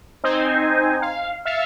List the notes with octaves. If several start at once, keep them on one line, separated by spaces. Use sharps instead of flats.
C4 D#4 C5 G#5
F5
E5 F5 F6 A6 C7 C#7